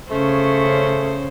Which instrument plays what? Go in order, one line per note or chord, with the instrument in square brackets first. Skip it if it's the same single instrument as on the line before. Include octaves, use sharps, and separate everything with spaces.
[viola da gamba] C#3 C#4 C5 [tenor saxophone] A3